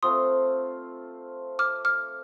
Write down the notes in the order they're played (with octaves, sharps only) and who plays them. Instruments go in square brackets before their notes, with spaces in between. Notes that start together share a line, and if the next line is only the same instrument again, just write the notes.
[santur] A3 C4 F4 C5 [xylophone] C6 D#6
[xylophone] D6 F6
D6 F6